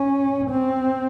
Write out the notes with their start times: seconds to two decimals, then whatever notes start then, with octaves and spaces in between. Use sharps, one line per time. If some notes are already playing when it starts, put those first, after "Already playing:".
Already playing: C#4
0.50 C4